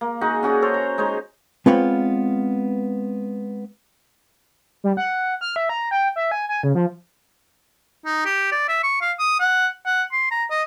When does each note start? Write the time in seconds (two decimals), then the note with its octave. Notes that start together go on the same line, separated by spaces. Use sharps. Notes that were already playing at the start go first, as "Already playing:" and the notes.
0.01 A#3
0.21 D#4 F#4 G#4 F#5
0.43 C#4 F#4 G#4 D5
0.62 A4 C5 C#5
0.74 A#5
0.98 G#3 D#4 C5 C#5
1.66 G#3 B3 C4 F4 B4 C#5
4.84 G3
4.97 F#5
5.41 F6
5.56 E5
5.69 A#5
5.91 G5
6.16 E5
6.31 G#5
6.49 G#5
6.63 C#3
6.75 F3
8.06 D#4
8.26 G4
8.52 D5
8.69 E5
8.83 C#6
9.01 F5
9.19 D#6
9.40 F#5
9.86 F#5
10.12 C6
10.31 A#5
10.51 D#5